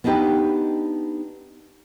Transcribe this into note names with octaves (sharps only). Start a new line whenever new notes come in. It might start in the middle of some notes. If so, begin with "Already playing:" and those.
B3 D4 D#4 G4 B4